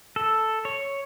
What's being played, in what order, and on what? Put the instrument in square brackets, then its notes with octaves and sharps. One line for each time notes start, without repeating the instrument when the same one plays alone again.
[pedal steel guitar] A4
C#5